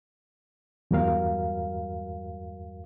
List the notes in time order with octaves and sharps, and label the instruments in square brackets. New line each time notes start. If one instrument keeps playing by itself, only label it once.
[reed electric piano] E2 G2 G3 F#4 A#4 F5